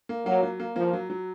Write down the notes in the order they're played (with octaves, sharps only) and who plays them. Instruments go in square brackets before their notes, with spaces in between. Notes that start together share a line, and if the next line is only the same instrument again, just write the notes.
[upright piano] A#3
[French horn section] F#3 [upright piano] A#3
[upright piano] F#3
A#3
[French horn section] F3 [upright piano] A#3
[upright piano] F#3
F#3